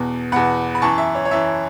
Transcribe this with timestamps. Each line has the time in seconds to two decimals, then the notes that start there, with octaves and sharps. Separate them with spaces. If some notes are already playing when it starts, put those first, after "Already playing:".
Already playing: E2 B2
0.32 E2 B2 F#5 B5
0.75 B5
0.81 F#2 E3 A5 C#6
0.98 E5
1.15 C#5
1.25 C#5
1.31 F#2 E3 E5